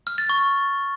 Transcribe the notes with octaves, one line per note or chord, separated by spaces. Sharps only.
F6
A6
C#6